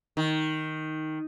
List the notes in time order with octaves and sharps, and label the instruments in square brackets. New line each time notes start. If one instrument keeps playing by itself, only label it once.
[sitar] D#3